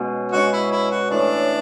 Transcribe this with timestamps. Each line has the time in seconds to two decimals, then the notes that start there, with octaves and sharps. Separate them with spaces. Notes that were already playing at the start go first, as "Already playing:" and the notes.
Already playing: B2 G#3 C#4
0.32 B2 G#3 C#4 F#4
0.53 E4
0.72 E4
0.91 F#4
1.11 A2 E3 A3 D4